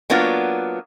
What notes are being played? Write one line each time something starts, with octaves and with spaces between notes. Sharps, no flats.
F#3 A#3 B3 D4 F4